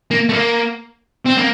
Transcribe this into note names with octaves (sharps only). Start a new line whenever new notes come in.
A#3
A3
A#3
C4
A#3